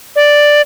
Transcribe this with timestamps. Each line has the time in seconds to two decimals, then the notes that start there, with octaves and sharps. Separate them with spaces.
0.16 D5